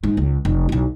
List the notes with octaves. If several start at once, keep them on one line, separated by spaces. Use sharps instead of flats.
G#2
C#2
F1
B1 E4